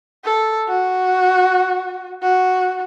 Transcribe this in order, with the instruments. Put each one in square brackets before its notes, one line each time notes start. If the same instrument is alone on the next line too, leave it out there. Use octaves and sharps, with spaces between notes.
[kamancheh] A4
F#4
F#4